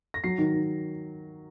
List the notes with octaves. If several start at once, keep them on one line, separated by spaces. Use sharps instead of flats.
A#6
F#3 C7
D#3
D#3